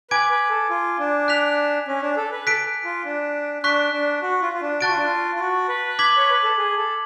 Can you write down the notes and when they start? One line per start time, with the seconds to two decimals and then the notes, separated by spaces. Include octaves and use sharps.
0.11 B4 G#5 D6 G#6 D7
0.30 B4
0.50 A4
0.70 F4
0.99 D4
1.28 F#6 B6 F7
1.88 C#4
2.02 D4
2.17 A4
2.32 B4
2.47 A4 F#6 B6 D7
2.85 F4
3.05 D4
3.63 D4 C#6 F#6 B6
3.93 D4
4.22 F#4
4.42 F4
4.54 F4
4.62 D4
4.81 F#4 A5 C#6 F#6 A6 D7
4.90 F4
4.97 D4
5.04 F4
5.35 F4
5.40 F#4
5.69 B4
5.99 D6 G#6 B6 F#7
6.17 C#5
6.31 B4
6.43 A4
6.57 G#4
6.77 A4